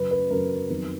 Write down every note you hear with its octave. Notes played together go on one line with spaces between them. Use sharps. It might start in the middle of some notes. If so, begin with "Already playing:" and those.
Already playing: F#2 C#3 F#3 B4
B4
F#2 C#3 F#3 A#4
F2 D#3 F#3 B3